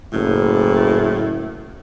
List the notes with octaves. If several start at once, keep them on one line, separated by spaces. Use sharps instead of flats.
F#1 A2